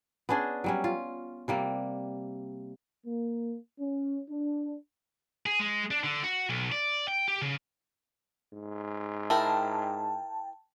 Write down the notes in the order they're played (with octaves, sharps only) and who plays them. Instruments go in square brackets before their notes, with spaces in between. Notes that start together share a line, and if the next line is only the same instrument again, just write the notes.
[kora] B3 C#4 D4 G#4
F#3 G3 C#4
F4
C3 G3 A#3
[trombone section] A#3
C#4
D4
[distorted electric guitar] G#4
G#3
D4
D3
F#4
B1
D5
G5
G4
C#3
[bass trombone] G#2
[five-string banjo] E4 A#4 [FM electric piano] G5 A5